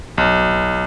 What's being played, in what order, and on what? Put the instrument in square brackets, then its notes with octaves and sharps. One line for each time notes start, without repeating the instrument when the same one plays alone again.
[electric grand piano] B1